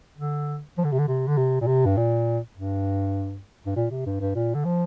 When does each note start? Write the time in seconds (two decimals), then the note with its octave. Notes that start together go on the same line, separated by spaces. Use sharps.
0.18 D3
0.78 F3
0.85 D3
0.92 C3
0.99 D3
1.08 C3
1.27 D3
1.37 C3
1.61 A#2
1.67 C3
1.85 G2
1.97 A#2
2.57 G2
3.66 G2
3.76 A#2
3.91 C3
4.06 G2
4.21 G2
4.35 A#2
4.55 D3
4.65 F3